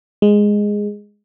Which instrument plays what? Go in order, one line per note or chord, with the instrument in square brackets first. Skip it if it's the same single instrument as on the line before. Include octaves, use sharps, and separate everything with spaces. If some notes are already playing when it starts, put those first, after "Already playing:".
[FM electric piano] G#3